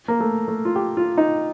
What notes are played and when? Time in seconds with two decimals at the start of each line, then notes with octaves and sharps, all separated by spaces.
0.08 A#3
0.20 A3
0.48 A3
0.65 F4
0.76 G4
0.97 F4
1.17 D#4